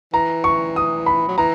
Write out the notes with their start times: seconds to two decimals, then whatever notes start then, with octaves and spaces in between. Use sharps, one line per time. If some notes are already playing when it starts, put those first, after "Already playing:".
0.13 E3 A#5
0.44 C#6
0.76 D#6
1.06 B5
1.28 F#3
1.38 E3 A#5